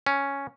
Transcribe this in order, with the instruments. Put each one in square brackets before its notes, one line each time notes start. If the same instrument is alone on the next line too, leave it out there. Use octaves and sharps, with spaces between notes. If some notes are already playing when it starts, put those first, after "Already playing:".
[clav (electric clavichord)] C#4